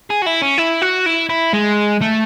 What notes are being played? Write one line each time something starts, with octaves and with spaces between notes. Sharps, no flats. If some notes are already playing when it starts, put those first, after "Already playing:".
G#4
F#4
E4
C#4
E4
F#4
E4
E4
G#3
A3